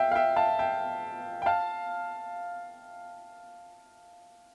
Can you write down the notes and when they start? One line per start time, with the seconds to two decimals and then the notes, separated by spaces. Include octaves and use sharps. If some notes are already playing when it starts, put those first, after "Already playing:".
Already playing: E5 F5 G5
0.12 F5
0.15 E5 G5
0.36 F5 A5
0.59 E5 G5
1.42 G5
1.46 F5 A5